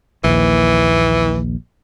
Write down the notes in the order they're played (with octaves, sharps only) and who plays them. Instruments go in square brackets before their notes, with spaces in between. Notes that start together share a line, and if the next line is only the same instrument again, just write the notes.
[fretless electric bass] A#1 D#2 [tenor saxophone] E3